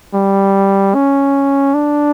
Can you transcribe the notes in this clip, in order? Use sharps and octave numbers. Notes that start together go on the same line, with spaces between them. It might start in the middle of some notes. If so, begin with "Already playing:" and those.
G3
C#4
D4